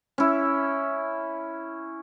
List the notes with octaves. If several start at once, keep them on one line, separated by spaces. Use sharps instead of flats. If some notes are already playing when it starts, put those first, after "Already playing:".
C#4 E4